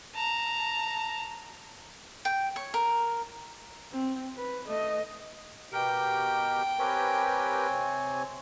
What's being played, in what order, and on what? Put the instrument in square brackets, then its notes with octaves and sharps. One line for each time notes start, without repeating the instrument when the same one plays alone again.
[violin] A5 A#5
[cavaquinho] G5
C#5
A#4
[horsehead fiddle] C4
B4
A3 D#5
[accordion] B2 G4 [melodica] A#4 [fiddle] G5
[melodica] C4 C#5 G#5 [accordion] G4 A#4 B4
[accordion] C3